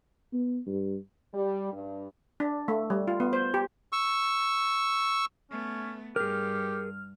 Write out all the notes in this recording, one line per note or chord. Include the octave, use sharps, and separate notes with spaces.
B3
G2
G3
G2
D4
A3
G3
F4
B3
C5
G4
C#6 E6
A3 B3 C#4
G2 G4 G#4 A#4 F6